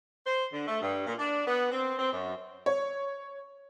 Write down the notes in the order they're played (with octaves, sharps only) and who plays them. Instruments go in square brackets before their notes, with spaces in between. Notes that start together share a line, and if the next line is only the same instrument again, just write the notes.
[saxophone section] C5
D3
A3
G2
A#2
D4
B3
C4
C4
F#2
[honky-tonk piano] C#5